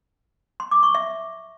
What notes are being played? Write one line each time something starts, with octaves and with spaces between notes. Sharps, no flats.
C6
D6
C#6
E5